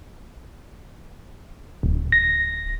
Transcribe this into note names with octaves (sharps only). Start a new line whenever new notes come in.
D1
A#6